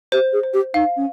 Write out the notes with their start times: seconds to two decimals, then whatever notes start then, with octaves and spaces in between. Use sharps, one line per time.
0.12 G4 C5
0.33 G#4
0.43 C5
0.54 G4
0.74 D#4 F5
0.97 C#4